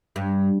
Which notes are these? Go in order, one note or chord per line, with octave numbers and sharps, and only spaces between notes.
G2